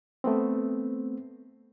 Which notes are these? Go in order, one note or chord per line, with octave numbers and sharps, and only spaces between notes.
A3 B3 C4